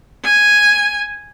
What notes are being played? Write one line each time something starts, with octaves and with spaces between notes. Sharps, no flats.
G#5